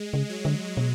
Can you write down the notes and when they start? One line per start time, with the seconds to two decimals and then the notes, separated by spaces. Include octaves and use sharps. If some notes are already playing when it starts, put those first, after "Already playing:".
Already playing: G#3
0.13 C#3
0.29 F#3
0.45 D3
0.77 B2